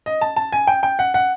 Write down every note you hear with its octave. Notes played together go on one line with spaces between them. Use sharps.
D#5
A5
A5
G#5
G5
G5
F#5
F#5